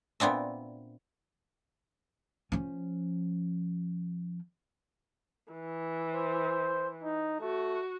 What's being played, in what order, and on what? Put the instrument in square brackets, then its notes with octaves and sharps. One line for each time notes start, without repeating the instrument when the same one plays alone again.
[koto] A#2 B3 C4 D4 E5
[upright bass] F3 C#4
[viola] E3
[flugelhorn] C5
D#4
[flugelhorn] A3 [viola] F#4